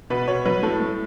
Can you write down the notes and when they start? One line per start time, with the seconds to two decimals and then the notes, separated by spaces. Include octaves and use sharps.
0.10 B2 B4
0.28 B2 C#5
0.45 F#3 B4
0.63 A2 A4
0.80 A2